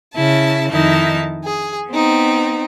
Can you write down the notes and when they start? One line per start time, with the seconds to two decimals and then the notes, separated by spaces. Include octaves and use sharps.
0.13 C#3 E4 A5
0.71 F2 D#3 D#4 E4 A5
1.44 G#4
1.89 B3 C4 D#4